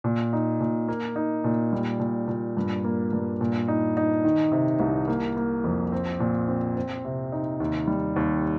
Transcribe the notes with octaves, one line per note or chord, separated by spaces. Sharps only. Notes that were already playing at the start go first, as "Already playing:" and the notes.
A#2
D#4
A#2
A#3
D#4
A#2
G3
A#2
A#2
G2
A#3
G2
A#2
D#4
D#4
D#3
C3
C2
A#3
A#3
F2
C4
A#2
C4
C4
C3
D#4
D#2
G3
D#2